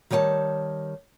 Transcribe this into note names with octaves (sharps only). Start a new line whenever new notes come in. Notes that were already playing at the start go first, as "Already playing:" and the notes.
D#3 G3 C#5 G5 A5